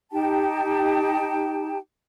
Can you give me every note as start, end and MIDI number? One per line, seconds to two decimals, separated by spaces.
0.12 1.78 63
0.12 1.78 67
0.12 1.78 79
0.12 1.78 81